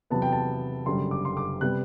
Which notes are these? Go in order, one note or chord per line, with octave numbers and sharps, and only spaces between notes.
E2 C3 F#3 B3 A5
G5
A5
F#1 F#2 D3 G3 C6
D6
C6
D6
C3 G3 B3 F#6